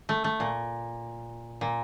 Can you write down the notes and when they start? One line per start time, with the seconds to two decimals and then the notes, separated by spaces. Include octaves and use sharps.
0.09 A3
0.24 A3
0.40 A#2
1.61 A#2